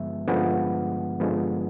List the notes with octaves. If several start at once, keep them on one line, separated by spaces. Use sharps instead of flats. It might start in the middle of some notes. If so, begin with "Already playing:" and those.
Already playing: G2 D3 F3 G#3 B3 E5
G2 D3 F3 G#3 B3 F#5
G2 D3 F3 G#3 B3